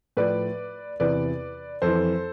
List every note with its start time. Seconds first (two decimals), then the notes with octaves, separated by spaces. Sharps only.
0.17 A2 F3 B4 D5
1.00 E2 C3 E3 B4 D5
1.82 F2 E3 A4 C5